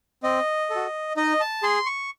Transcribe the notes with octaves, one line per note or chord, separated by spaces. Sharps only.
C4 D#5
A4
F#4
D#4 D#5
A5
G#4 C6
C#6